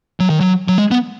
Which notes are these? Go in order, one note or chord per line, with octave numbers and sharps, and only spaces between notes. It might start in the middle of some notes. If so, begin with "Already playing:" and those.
F#3
D#3
F#3
F#3
G#3
B3